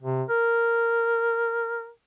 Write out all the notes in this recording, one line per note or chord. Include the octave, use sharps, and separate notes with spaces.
C3
A#4